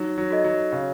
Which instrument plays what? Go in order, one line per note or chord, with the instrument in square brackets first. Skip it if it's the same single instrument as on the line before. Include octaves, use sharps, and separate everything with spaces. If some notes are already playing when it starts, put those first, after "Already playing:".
Already playing: [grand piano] F#3 [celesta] D#4
[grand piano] F#3
[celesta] F#4 A4 D#5
[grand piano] F#3
[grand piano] C#3 [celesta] C#5